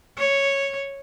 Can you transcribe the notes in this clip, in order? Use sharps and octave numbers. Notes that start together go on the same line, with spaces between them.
C#5